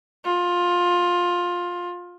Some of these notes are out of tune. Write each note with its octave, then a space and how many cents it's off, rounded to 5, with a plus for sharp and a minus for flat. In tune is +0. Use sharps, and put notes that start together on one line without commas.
F4 +15